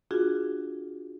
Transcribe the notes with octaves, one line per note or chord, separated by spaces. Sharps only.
D4 F4 F#4 G#4